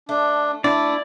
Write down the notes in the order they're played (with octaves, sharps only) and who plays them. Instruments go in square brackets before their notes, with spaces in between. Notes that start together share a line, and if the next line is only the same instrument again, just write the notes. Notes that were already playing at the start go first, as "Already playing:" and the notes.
[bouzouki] A3 [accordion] D4
[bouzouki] A3 [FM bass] D4 [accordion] E4 [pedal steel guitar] D5